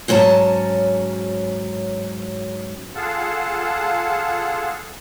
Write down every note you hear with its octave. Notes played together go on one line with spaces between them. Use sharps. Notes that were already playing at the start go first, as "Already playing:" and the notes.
G#2 F#3 C#4 A#4 A5
F4 G#4 A4 F5 F#5 A5